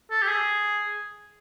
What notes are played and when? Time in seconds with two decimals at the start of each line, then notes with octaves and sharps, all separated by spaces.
0.11 A4
0.23 G4
0.28 G#4